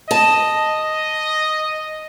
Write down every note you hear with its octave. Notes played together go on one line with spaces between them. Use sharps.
D#5 A5